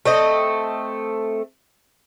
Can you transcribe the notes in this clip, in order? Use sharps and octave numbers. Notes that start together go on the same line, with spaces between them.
A3 C4 D#5